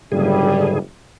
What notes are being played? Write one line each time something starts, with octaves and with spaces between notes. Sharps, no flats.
F#1 G#2 D3 G3 G#4